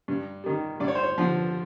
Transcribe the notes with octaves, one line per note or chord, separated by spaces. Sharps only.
G2
D#3 G3
G2 D5
C#5
C5
C#5
D3 F3